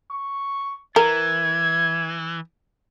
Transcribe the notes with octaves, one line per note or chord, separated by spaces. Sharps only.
C#6
E3 A#4 G#6